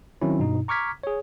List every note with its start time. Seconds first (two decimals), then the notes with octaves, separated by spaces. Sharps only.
0.22 D#3 F#3 C4 C#4 E4
0.39 G2 B2 D#4
0.68 A#5 C#6 D6 F6 G#6 B6
1.03 G#4 C#5